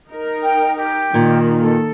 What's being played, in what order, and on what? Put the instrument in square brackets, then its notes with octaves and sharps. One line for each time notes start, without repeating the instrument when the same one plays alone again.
[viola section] D#4 A#4
[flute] G5
G4
[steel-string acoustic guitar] A#2 [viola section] D#3 A#3
[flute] A4